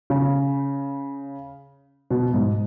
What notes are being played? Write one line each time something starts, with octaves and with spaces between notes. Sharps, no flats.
C#3
B2
G#2